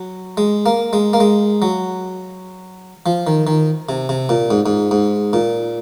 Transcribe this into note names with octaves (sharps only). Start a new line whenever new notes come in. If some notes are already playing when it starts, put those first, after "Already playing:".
Already playing: F#3
G#3
A#3
G#3
A#3
G#3
F#3
F3
D#3
D#3
C3
C3
A#2
G#2
G#2
G#2
A#2